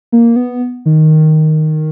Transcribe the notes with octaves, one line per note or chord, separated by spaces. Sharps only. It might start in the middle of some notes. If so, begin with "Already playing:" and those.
A#3
B3
D#3